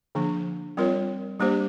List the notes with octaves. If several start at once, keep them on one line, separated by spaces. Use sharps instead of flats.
D3 F3 A#3 D4
G3 C4 F4 A#4 C#5
G3 A#3 D4 G4 C5